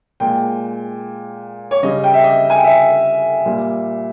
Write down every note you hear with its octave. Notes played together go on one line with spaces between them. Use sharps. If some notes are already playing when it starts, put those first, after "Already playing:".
A#2 G#3 G5
C#5
C#3 G3 D#5
G5
E5
D#5
G#5
G5
E5
A#2 G3